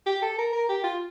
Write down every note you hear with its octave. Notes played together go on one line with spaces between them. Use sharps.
G4
A4
A#4
A#4
G4
F4